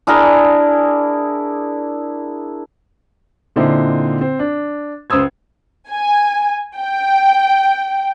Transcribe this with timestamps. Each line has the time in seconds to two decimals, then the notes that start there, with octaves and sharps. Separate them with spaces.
0.07 D4 E4 G#4 A#4
3.56 A#2 D3 C4 D#4 E4
4.21 C4
4.39 D4
5.10 C#2 C5 D#6 E6 G#6
5.91 G#5
6.77 G5